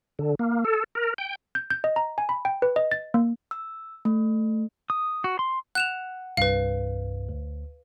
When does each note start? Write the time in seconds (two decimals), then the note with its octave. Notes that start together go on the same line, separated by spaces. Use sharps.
0.19 D3
0.39 A#3
0.64 A4
0.95 A#4
1.18 G5
1.55 G6
1.70 G6
1.84 D#5
1.96 A#5
2.18 G#5
2.29 B5
2.45 G5
2.62 B4
2.76 D#5
2.92 A6
3.14 A#3
3.51 E6
4.05 A3
4.90 D#6
5.24 F#4
5.39 C6
5.75 F#5 F#6 E7 F7
6.37 C2 G2 B4 F5
7.29 D2